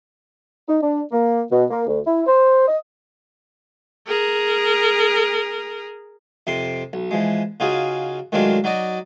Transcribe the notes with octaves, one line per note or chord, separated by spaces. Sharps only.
D#4
D4
A#3
B2
A#3
D2
E4
C5
D#5
G#4 A#4
F2 C3 C4 C6
B1
E3 F3 G#3
C#3 D#4 F4 F#4 G#4
A2 D#3 F#3 G#3 D4 F4
F#3 D#4 F#4 D5 D#5